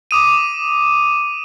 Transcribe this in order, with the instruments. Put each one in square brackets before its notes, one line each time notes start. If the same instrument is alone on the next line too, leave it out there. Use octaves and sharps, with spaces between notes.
[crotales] D6 D#6 D#7